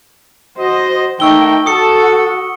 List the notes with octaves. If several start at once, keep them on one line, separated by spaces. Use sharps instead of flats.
F#4 C5 D#5
D#3 A3 A#3 D#4 G5 C#6 E6 G7
F#4 A4 D#6 C#7